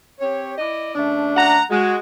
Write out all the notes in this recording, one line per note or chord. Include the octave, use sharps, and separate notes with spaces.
C4 G4 C#5
E4 D5 D#5
C#3 A3 D4
F#5 A#5
G#3 F#4